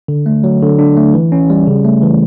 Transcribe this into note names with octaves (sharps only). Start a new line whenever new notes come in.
D3
A3
F#3
D3
D4
A3
E3
C#4
G3
C#3
A3
E3